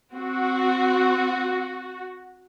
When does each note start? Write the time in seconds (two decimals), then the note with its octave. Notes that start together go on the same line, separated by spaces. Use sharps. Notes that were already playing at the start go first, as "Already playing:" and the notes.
0.15 C4 F#4